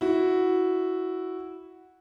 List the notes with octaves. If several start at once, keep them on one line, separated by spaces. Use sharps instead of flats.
E4 F#4